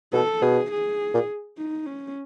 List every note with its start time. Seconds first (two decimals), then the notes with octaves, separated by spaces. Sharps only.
0.13 B2 A4
0.42 B2 G#4
0.71 G#4
1.14 A#2
1.57 D#4
1.86 C#4